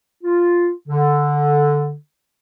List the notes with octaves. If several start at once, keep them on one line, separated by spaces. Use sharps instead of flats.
F4
D3